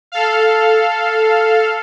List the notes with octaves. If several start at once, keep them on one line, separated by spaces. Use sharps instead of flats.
A4 F5